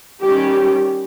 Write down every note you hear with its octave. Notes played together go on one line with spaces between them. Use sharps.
D#3 G3 C#4 G4